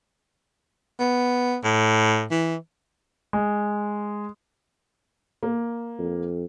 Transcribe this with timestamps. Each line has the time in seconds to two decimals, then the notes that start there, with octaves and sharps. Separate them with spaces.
1.00 B3
1.64 A2
2.31 E3
3.33 G#3
5.43 A#3
5.99 F2